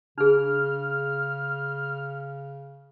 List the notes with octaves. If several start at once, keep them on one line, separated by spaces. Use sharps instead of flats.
C#3 D4 G#4 F6